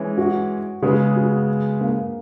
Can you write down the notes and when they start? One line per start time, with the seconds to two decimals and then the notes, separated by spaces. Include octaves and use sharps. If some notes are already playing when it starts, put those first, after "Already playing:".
Already playing: E3 G#3 C#4
0.18 F#4
0.82 C#3 G#3 B3 G#4
1.16 F#4
1.81 A#3